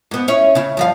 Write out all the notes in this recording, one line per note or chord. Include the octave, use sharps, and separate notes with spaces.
G#2 B3
C#4 E4 C#5
C#3 E4
G2 F3 F5